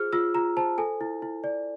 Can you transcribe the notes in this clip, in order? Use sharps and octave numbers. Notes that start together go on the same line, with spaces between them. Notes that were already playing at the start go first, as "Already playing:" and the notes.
Already playing: F4 G#4 C5 F6
F4 E6
F4 A#5
C5 A5
A4 G#5
E4
E4
D5